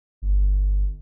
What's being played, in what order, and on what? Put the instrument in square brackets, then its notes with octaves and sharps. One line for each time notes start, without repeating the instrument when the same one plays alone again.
[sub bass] G1